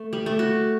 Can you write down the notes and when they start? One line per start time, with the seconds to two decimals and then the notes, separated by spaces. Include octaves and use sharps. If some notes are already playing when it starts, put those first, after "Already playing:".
Already playing: A3
0.13 G3
0.26 A3
0.39 F#4